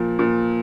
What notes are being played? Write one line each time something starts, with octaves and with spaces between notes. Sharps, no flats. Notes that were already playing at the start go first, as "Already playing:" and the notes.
Already playing: A#2 F3
A#2